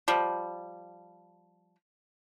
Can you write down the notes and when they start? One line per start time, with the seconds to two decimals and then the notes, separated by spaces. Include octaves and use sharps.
0.08 F3 G3